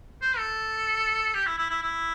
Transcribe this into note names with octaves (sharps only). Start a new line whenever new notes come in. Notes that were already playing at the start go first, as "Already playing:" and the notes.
C5
A4
G4
E4
E4
E4
E4